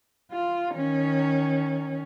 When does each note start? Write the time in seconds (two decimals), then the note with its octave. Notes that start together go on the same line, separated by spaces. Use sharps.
0.32 F4
0.74 D#3 C#4